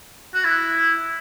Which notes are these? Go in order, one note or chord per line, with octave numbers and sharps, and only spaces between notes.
F#4
E4